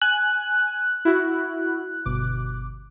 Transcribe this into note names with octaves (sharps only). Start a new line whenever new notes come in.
G#5 F#6
E4 F#4
G1 B2 D6